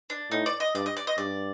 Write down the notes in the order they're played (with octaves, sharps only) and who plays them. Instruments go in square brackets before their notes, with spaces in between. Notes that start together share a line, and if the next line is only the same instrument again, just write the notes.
[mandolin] D4
[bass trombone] A2 [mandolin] D#4
[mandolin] D5
D#5
[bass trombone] G2 [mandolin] D5
[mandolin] D#5
D5
D#5
[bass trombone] G2 [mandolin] D5